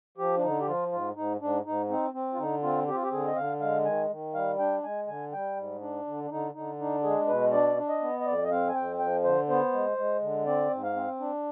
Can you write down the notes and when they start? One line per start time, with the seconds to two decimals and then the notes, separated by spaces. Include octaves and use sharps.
0.18 F3 G4
0.37 D4
0.42 D3 D#4
0.60 G4
0.67 F3 F4
0.92 G#2 F4
1.16 G#2 D#4
1.41 G#2 D4
1.65 G#2 D#4
1.89 C4 D#4
2.13 C4
2.33 F4
2.38 D3 D#4
2.63 C4 F4
2.88 C4 G4
2.95 F4
3.03 G4
3.11 D3 G#4
3.27 D#5
3.36 D3 F5
3.60 G#3 F5
3.85 D#3 G#5
4.10 D#3
4.34 G3 F5
4.59 D4 G5
4.83 G#3 G#5
5.07 D3 G#5
5.32 G3 G5
5.56 G#2
5.81 D4
6.06 D3
6.24 D4
6.30 D3 D#4
6.54 D3 D#4
6.79 D4 D#4
7.03 G#3 G#4
7.27 B2 B4
7.52 D4 D5
7.77 D4
7.89 D#5
8.01 B3
8.20 D#5
8.25 F2 D5
8.44 D#5
8.50 C4 F5
8.68 G#5
8.75 F2 G5
8.99 F3 G5
9.23 D3 C5
9.48 B3 C5
9.73 G#3
9.97 G#3
10.21 D3
10.46 C4 D5
10.71 G#2
10.83 F5
10.95 C4
11.20 D4